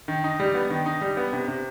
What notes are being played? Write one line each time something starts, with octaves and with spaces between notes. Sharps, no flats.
D#3
D#4
G3
B3
D#3
D#4
G3
B3
C3
C3